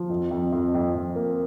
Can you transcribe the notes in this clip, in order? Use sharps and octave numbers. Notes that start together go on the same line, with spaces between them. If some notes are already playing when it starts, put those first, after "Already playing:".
Already playing: F3
F2
F2
F2
F2
F2
A#3